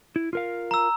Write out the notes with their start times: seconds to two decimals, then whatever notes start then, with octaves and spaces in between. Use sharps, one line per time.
0.16 E4
0.33 F4 A#4 F5
0.71 A#5 E6